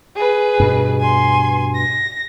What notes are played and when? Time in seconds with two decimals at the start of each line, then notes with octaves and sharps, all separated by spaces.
0.16 G#4 B4
0.60 G2 B2
1.00 G#5 C6
1.75 A#6